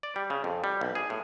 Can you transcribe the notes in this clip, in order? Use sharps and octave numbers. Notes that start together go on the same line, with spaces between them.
D5
G3
C#3
F2
G3
B1
G#4
A2